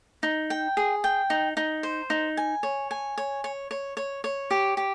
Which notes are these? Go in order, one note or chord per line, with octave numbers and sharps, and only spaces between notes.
D#4
G5
G#4
G5
D#4
D#4
C5
D#4
G#5
C#5
G#5
C#5
C#5
C#5
C#5
C#5
G4
G4